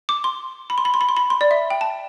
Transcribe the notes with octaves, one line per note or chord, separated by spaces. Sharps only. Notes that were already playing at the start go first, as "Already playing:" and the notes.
D6
C6
B5
C6
B5
C6
B5
C6
B5
C6
D5
E5
G5
A5